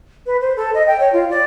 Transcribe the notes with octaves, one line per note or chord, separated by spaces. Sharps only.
B4
C5
A4
D#5
G5
C#5
F4
D5